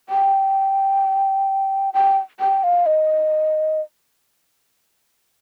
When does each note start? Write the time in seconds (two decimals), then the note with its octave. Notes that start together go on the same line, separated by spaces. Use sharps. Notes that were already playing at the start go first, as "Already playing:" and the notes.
0.09 G5
1.94 G5
2.40 G5
2.64 F5
2.86 D#5